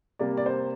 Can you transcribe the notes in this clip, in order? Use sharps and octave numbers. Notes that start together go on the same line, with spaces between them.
C3 G3 A#3 D5
D5
C5